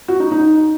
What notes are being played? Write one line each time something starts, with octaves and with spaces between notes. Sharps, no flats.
F#4
D#4
D#4